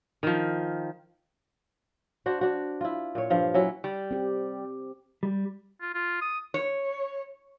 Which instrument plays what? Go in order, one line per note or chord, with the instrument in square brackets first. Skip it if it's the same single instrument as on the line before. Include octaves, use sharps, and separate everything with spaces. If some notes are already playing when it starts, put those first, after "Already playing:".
[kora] D#3 F3
D4 F#4 C5
D4 F#4
E4 F4
A#2 C#5
G2 F3 F5
F#3 C#4 E4
[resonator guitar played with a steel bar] G3
[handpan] C4 G4
[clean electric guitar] G3
[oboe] F4
F4
D#6
[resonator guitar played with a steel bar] C#5